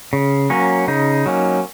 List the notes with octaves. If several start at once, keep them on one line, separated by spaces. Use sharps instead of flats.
C#3
F#3 A#3 C#4
C#3 D#4
F#3 A#3 C#4